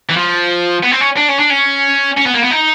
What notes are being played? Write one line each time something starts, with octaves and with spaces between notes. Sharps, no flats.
E3
F3
B3
C4
C#4
D4
C#4
D4
C#4
C#4
B3
A#3
B3
D#4